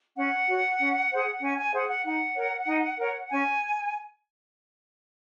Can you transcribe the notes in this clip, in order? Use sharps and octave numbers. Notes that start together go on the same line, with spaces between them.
C#4 F#5
F#4 C#5
C#4
G#4 C5
C#4 G#5
G#5
G#4 C5 F#5
F#5
D#4 F#5
A#4 C#5
D#4
A#4 C#5
C#4 G#5